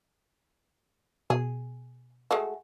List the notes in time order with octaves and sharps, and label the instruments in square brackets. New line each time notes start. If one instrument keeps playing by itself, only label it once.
[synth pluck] B2 [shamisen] G#4
[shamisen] G#3 A3 F#4